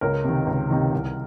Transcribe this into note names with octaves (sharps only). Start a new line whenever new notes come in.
C#2 A#4 C#5
C3 D#3
C#2
C3 D#3
C2